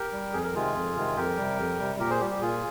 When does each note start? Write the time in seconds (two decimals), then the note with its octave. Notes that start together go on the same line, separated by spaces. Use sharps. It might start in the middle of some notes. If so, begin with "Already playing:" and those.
Already playing: G4 A#4
0.13 G3
0.33 F2 G#4
0.44 A#4
0.54 C3 D#3 G#3 F4 G#4
0.76 F2
0.96 C3 D#3 G#3
1.17 F2 G4 A#4
1.37 C3 G3
1.58 F2
1.80 C3 G3
1.99 A#2 G4 A#4
2.10 G#4 C5
2.20 G3 G4
2.31 G4
2.42 A#2 F4 G#4